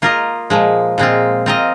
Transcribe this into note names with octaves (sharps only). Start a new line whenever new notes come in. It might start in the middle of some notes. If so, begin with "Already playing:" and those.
A#3 F4 A#4 D#5
A#2 F3 G#3
A#2 G#3 C4 F4
C4 F4 A#4 D#5